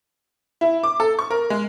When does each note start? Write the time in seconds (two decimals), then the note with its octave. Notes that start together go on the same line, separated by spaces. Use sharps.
0.61 E4
0.83 D6
1.00 A4
1.19 C#6
1.30 A#4
1.50 G#3